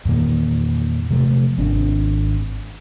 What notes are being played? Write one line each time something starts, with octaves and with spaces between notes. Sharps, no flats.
E2 A#2 D#3 A#3
C3 F3 A3
G#1 C4 D4